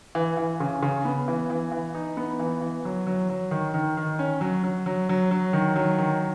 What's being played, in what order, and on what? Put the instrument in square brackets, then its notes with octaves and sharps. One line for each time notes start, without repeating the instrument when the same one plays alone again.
[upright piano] E3
E3
C#3
C#3
B3
E3
E3
E3
D#4
B3
E3
E3
F#3
F#3
F#3
D#3
D#3
D#3
C#4
F#3
F#3
F#3
F#3
F#3
D#3
F#3
D#3